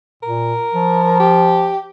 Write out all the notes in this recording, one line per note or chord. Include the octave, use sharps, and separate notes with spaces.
A#2 A#4
F3
G4